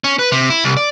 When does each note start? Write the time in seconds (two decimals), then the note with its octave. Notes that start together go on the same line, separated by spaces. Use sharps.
0.04 C#4
0.19 B4
0.32 C3
0.50 E4
0.64 C2
0.77 D5